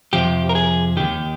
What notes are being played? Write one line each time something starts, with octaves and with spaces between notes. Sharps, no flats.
F2 C3 F3 G4
A#4
G#4
D#2 D#3 G4